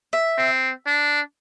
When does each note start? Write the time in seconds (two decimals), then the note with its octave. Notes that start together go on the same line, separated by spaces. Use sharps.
0.13 E5
0.38 C4
0.86 D4